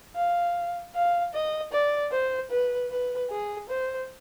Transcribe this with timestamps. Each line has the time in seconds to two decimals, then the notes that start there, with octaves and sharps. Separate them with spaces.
0.16 F5
0.95 F5
1.33 D#5
1.72 D5
2.12 C5
2.50 B4
2.91 B4
3.30 G#4
3.69 C5